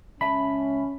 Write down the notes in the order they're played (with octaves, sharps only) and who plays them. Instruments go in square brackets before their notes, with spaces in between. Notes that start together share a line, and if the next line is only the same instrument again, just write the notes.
[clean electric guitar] C#2 E5 A5 [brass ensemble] C#4 [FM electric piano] B5